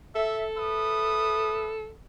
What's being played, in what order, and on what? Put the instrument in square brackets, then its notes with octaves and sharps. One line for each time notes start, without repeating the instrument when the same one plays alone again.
[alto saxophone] A4 [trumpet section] E5
[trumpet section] B4 E5 D#6